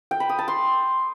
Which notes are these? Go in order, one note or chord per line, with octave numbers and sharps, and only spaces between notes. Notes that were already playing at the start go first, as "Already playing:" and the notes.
G5
B5
D#6
A5
C6